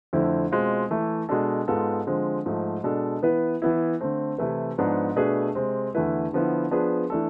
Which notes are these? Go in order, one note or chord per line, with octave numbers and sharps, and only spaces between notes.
F2 D3 A3 C4 E4
B2 G#3 C4 F4
E3 A3 E4
B2 G#3 D4 A4
G#2 G#3 B3 F4 A4
D3 F3 G#3 C4
G#2 F3 A3
B2 G#3 D4 A4
E3 B3 E4 B4
E3 B3 E4
D3 A3 C4
C3 E3 A3 E4 B4
G#2 F3 B3 D4
B2 A3 D4 G#4 B4
C3 G#3 C4
E2 D3 A3 E4 B4
D3 F3 B3 E4
F3 B3 D4 G#4 B4
E3 A3 D4 A4